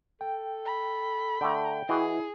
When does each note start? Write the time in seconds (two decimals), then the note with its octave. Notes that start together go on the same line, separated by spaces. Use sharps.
0.21 A4 G5
0.66 B5
1.41 D3 A3 G5
1.89 E3 E4 F#4 G#4 D#5